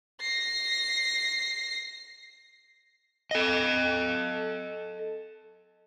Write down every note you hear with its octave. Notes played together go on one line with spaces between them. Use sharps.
A#6 C7
A4 D#5